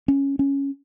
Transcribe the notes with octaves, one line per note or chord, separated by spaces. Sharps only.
C#4
C#4